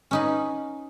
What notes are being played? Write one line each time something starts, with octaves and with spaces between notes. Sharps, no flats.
C#4 D#4 B4